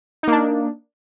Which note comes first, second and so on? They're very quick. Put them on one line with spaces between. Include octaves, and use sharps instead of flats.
D#4 A#3 D4